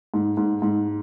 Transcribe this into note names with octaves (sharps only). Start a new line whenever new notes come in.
G#2
G#2
G#2